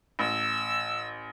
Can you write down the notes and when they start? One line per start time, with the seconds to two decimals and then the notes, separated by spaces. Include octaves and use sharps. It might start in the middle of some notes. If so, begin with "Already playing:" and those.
0.19 A1 E6